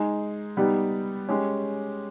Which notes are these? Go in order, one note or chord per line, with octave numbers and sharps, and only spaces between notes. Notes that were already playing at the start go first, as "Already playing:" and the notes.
Already playing: G#3 D#4 G#4
G3 B3 D#4 G4
G#3 C#4 G4